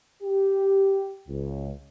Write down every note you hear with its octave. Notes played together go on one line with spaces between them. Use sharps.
G4
C#2